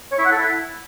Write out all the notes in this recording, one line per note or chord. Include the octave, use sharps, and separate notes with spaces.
C#5
E4
F#5
A4
E4